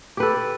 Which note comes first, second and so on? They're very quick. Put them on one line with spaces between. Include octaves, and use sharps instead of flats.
G4 B4 A4